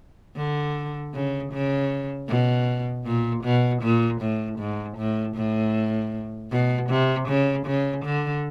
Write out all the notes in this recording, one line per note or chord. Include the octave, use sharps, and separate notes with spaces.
D3
C#3
C#3
B2
A#2
B2
A#2
A2
G#2
A2
A2
B2
C3
C#3
C#3
D3